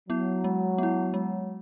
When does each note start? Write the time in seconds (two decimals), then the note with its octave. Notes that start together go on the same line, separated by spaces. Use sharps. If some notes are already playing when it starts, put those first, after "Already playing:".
0.09 F#3 B3 E4
0.44 G#3
0.78 B3 E4
1.14 G#3